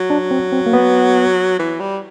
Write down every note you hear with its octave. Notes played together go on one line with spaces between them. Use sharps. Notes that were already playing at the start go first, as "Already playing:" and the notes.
Already playing: F#3
D4
C4
C4
A#3
B3
E3
G3